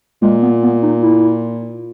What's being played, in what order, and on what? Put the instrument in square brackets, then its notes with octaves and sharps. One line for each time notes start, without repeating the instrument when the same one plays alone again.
[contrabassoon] A#2 [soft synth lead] G#3
[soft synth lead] B3
B3
D#4
E4